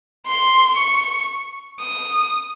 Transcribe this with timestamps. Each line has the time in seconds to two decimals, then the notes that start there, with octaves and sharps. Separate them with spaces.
0.26 C6
0.77 C#6
1.80 D#6